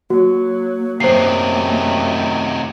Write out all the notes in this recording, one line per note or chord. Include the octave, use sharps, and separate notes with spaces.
F#3 A#3 F#4
F#2 C3 D#3 A3 C5 C7